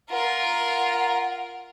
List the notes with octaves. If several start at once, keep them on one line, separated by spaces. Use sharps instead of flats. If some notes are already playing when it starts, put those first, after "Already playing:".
F4 A#4 F#5